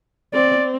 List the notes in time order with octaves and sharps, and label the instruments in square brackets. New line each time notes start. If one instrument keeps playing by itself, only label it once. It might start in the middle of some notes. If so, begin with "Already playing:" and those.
[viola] C4 [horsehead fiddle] D5